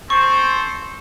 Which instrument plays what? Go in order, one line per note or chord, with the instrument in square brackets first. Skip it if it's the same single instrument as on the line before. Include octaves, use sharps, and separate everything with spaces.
[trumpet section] C4 A4 C5 [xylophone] C#6